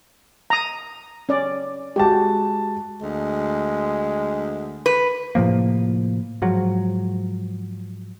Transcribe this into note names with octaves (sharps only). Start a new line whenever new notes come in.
A#5 D#6
C#4 D5
G#3 F#4 G4 A5
D2 G#3
B4
A2 C3 F3 A#3
G#2 F3 F#3